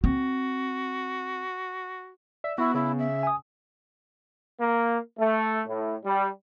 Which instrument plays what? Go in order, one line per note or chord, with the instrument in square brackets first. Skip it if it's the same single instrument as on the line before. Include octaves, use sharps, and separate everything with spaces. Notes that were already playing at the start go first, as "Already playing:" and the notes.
[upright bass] C4 [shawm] F#4
[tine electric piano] D5 [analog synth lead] E5
[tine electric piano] B3 [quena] E4 [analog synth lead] F#4
[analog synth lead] C#3 [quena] E4
[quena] E5
[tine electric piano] G#5 D#6
[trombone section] A#3
A3
A2
G3